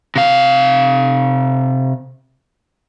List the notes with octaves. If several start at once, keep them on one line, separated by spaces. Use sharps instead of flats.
C3 F5